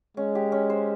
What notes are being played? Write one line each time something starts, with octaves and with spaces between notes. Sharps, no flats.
G#3 C#4
G4
C#4
C5